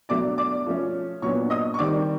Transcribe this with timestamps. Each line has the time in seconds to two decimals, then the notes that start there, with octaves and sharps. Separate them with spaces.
0.09 B2 F#3 A3 D4 D5 D6
0.38 D5 D6
0.66 F3 A3 C#4
1.22 A#2 F#3 B3 D4 C#5 C#6
1.50 D#5 D#6
1.74 C#6
1.79 D#3 G3 C4 D5 D6